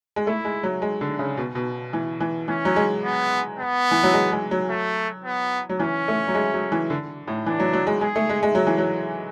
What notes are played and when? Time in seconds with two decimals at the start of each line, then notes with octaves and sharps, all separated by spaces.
0.16 G#3
0.26 A3 E4
0.45 G#3
0.63 F#3
0.82 G#3
1.01 D3
1.19 C#3
1.37 B2
1.55 B2
1.93 E3
2.21 E3
2.48 E3 C#4
2.65 F#3
2.76 G#3
3.03 B3
3.59 B3
3.91 E3
4.03 F#3
4.14 G#3
4.32 G#3
4.51 F#3
4.70 A3
5.24 B3
5.69 F#3
5.80 E3 C#4
6.08 A3
6.28 F#3
6.35 G#3
6.54 F#3
6.72 E3
6.90 D3
7.27 A2
7.46 E3 D4
7.60 F#3
7.73 F#3
7.87 G#3
8.01 G#3 G#4
8.16 A3
8.29 G#3
8.43 G#3
8.55 F#3
8.67 E3
8.78 F#3